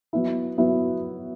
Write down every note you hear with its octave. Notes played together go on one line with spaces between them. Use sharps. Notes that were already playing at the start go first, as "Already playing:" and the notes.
F#3 B3 E4
F#3 B3 E4